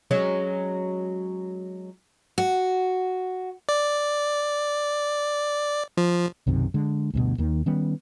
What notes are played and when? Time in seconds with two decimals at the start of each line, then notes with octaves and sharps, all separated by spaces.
0.11 F#3 G#3 C#4
2.38 F#4
3.69 D5
5.97 F3
6.47 B1 F#2 C3 D#3
6.74 D3 G#3
7.14 D2 G2 B2
7.38 D#2 D#3 A#3
7.66 D#3 G3 B3 C#4